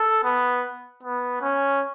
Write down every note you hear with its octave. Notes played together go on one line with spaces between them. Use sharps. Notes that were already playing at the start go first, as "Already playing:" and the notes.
Already playing: A4
B3
B3
C#4